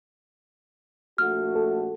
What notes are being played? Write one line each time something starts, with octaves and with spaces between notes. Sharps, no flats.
A#1 A3 F#4 F6
A4